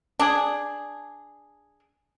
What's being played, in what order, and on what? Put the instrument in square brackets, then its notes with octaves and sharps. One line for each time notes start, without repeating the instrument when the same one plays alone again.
[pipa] D4 G#4